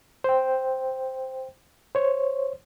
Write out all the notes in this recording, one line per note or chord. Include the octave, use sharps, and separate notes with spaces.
C5 G5
C5 C#5